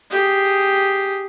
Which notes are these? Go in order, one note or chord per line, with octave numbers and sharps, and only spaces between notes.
G4 G#4